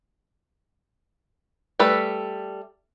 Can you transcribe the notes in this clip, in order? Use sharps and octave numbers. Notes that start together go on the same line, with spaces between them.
G3 A3 A4 B4